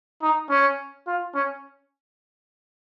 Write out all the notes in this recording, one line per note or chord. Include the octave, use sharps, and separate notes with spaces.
D#4
C#4
F4
C#4